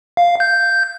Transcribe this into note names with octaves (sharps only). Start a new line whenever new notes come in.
F5
G6